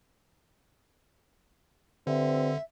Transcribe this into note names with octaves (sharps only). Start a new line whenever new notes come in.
G2 D3 C4 E5